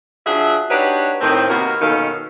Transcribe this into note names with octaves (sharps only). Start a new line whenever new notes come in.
F3 D4 F#4 G#4 E5
D4 D#4 F#4 G4 B4 C#5
A2 D#3 C4
C3 D#3 A#3 B3 F#4
D#2 B2 D#3 C#4 A4 F5